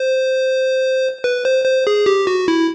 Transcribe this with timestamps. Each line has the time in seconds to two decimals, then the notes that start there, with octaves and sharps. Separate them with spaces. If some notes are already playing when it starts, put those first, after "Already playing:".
Already playing: C5
1.24 B4
1.45 C5
1.65 C5
1.87 G#4
2.06 G4
2.27 F#4
2.48 E4